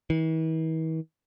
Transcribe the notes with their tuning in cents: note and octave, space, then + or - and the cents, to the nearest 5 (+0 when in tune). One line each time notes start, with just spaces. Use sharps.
E3 -45